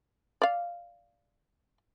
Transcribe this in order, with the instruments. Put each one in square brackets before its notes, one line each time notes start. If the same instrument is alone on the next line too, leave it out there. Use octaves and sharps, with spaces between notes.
[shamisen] D5 F5